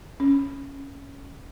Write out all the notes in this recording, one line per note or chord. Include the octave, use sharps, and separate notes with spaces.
C#4